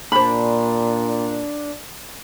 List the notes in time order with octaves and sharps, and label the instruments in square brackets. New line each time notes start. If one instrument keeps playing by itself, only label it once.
[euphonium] A#2 [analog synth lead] D4 [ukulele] C5 B5